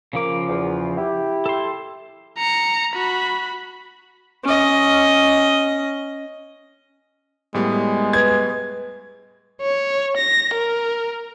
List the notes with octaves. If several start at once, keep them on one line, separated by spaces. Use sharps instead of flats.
C#3 F3 A#3 D6
E2
E4 G4
A4 C6
A#5 C#7
F#4 B5
C#4 D#5
A2 G3 G#3 B3
B4 G#6
C#5
A#6
A#4